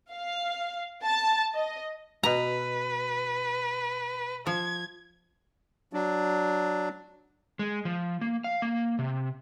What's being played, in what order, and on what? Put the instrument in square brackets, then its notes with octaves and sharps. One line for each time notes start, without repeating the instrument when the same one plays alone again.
[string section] F5
A5
D#5
[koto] B2 A#5 [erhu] B4
[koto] F3 [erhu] G#6
[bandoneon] F#3 D4
[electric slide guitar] G#3
F3
A#3
F5
A#3
C3